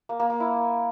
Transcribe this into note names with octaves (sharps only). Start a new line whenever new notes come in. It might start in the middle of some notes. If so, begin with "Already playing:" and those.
A#3
A#3
A#3
E4